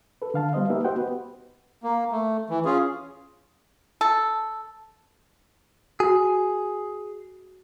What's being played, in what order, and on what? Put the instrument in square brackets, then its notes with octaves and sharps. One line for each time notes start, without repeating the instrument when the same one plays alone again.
[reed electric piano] A4 B4
D3 F5 A5
G3 B3 C5 D#5 F5
A#3 D#4 G4 A#4 B4 E5
F#4 G4 C5 D#5 F#5 G5
B3 B4
[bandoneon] A#3
A3
E3
C#4 F4 G#4
[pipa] A4
[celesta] F#4 [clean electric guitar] G#4